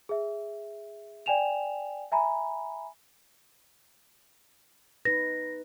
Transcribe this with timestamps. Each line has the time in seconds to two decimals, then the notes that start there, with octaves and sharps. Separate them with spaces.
0.09 G#4 E5
1.26 D5 G5 G#5 E7 F7
2.12 E5 G#5 A#5 B5
5.05 D#4 B4 A#6